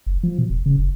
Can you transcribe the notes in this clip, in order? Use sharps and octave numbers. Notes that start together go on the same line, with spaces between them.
F#1
F3
B2
E1
C#3
F1